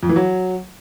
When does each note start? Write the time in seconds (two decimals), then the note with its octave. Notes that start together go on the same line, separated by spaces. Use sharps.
0.03 F2
0.09 E3
0.16 F#3